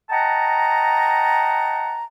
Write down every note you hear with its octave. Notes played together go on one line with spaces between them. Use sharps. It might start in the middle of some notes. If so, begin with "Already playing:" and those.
D#5 F#5 G5 A5 A#5